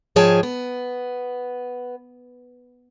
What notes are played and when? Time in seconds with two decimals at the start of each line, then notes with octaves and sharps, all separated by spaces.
0.16 G#2 F3 G#4 C#5 G5 A5
0.43 B3